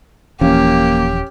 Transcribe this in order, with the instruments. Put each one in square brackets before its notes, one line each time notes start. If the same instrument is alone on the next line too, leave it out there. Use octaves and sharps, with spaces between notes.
[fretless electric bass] D#1 E3 F3 [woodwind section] A#3 [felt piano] C#4 [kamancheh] G4